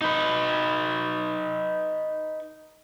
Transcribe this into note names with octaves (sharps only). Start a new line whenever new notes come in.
D#4 B4